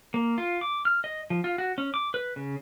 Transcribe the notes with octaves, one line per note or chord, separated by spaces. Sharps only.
A#3
F4
D6
F6
D#5
F3
F4
F#4
C#4
D6
B4
C#3